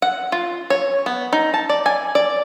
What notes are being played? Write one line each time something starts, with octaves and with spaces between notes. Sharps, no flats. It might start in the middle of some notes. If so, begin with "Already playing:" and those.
F#5
F4
C#5
B3
D#4
A5
D5
G#5
D5